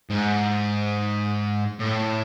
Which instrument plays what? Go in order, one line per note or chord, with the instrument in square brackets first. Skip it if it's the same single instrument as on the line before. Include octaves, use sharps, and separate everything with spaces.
[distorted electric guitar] G#2
A2